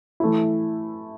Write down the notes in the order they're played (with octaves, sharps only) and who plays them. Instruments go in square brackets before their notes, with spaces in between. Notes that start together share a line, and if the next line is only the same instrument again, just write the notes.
[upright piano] E3 A3 E4